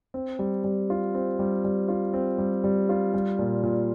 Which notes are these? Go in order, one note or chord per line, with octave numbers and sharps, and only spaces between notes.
C4
G3
G3
F4
C4
G3
G3
F4
C4
G3
G3
F4
G3
A#2
A#2